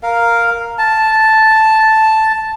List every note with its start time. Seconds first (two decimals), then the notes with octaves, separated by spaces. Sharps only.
0.03 A#4 F5
0.78 A5